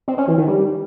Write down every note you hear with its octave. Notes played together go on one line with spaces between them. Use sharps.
C4
C#4
E3
D#3
G3